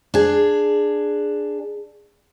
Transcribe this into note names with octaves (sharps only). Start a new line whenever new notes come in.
D4 G#4